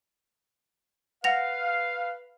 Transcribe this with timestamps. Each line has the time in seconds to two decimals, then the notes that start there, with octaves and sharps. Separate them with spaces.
1.24 B4 F5 F#5 A#6 F7